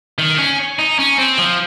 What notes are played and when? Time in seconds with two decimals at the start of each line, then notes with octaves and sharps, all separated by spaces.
0.18 D#3
0.38 C#4
0.79 D#4
0.99 C#4
1.19 C4
1.39 F3